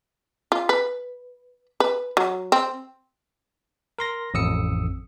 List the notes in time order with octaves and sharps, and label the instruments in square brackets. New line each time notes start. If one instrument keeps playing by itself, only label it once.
[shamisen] F4
B4
B4
F#3
C4
[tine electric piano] A#4 C6 A#6
A1 F2 D#6 E6 C#7